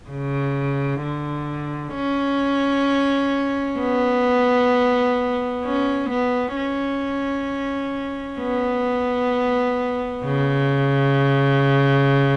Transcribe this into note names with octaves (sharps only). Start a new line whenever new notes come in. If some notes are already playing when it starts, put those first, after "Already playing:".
C#3
D3
C#4
B3
C#4
B3
C#4
B3
C#3